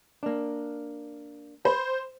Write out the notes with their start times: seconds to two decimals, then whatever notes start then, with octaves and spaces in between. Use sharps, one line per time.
0.23 A#3 D4
1.65 C5 B5